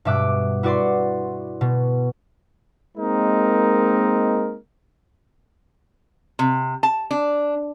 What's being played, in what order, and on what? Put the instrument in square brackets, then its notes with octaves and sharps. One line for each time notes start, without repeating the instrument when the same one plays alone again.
[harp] G2 B2 E5 D6 F#6
E4 F#4 B4 D5 F#5 C6
B2
[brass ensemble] G#3 A#3 C4 D#4 A#4
[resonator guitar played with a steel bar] C3
A5
D4